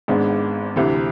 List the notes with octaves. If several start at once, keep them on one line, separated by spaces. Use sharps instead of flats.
G#1 G#2 G#3 B3 D4
D2 C3 E3